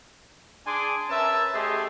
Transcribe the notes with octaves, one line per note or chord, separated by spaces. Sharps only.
D4 G#4 G#5 C6 D6
C#4 A#4 B4 E5 A5
A3 G4 G#4 D#5 C6